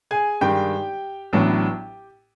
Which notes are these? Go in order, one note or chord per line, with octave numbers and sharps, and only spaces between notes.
G#4 G#5
G2 D#3 G#3 G4 G5
A1 A2 F#3 B3 D4